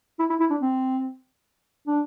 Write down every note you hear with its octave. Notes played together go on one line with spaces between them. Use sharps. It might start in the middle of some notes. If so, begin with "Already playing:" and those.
E4
E4
E4
D4
C4
D4